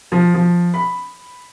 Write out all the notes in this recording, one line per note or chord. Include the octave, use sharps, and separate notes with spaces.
F3
F3
B5